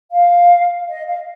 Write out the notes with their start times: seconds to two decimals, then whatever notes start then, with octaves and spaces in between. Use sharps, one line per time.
0.11 F5
0.89 D#5
1.08 F5